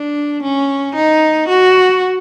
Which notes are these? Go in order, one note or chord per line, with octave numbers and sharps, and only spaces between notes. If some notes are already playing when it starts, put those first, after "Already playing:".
Already playing: D4
C#4
D#4
F#4